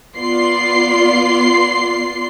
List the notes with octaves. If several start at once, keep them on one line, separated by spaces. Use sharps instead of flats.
B3 F4 D5 C6 C7